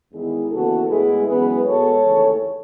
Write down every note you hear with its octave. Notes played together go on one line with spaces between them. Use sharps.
E2 D#3 G#3 B3 E4 G#4
D#2 C#3 E3 B3 F#4 A4
A2 G#3 B3 E4 G#4
F#2 E3 G#3 B3 G#4 B4
B2 G#3 B3 A4 C#5
D#2 C#3 E3 A3